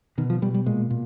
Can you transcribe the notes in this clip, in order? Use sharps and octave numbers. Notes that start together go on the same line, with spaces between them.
B2 D#3
F3
B2 G3
G3
A#2 G#3
A#2